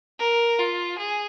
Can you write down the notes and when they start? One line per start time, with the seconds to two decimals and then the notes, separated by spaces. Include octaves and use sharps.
0.20 A#4
0.59 F4
0.98 G#4